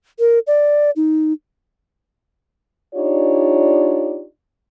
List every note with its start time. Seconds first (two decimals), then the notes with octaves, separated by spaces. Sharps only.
0.19 A#4
0.47 D5
0.96 D#4
2.95 D4 D#4 F4 G4 C#5 D5